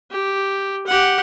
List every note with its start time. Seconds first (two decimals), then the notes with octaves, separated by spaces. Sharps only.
0.11 G4
0.87 G4 F#5